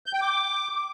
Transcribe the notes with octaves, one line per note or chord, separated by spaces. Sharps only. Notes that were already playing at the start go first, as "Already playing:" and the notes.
G6
G5
D6